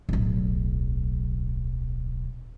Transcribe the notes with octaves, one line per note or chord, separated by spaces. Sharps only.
D1 B1